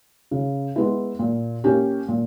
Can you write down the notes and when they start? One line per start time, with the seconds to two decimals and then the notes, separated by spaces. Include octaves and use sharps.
0.31 C#3
0.76 G#3 B3 E4
1.19 A#2
1.64 A#3 C#4 G4
2.08 A#2